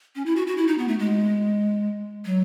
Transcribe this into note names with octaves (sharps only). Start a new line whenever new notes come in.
C#4
E4
F#4
F#4
E4
D#4
B3
A3
G#3
F#3